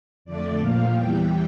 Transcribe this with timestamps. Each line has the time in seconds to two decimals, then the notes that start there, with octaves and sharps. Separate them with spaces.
0.25 F2 D3 A3 D5
0.58 A#2 F3 A#3 F5
0.92 E2 E3 G3 G5